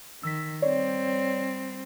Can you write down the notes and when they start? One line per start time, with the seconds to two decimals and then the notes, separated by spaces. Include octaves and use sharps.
0.23 D#3 E6 B6
0.62 G3 C4 C#5 D5